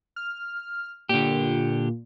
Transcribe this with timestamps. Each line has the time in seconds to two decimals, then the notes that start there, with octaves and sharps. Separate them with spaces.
0.16 F6
1.09 A#2 D3 G4